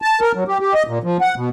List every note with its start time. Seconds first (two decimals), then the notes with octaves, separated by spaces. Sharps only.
0.02 A5
0.21 A#4
0.35 F#3
0.48 G4
0.60 G4
0.74 D#5
0.87 A#2
1.04 F3
1.21 F#5
1.36 B2